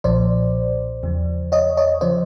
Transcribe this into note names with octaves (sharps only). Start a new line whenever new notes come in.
B1 A#2 F3 C5 D5
E2 C#3 F3
C#5 D#5
C#5 D#5
C#3 F3 C5 D5